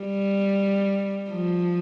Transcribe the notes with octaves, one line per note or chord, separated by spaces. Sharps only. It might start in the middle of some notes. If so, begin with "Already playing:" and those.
Already playing: G3
F3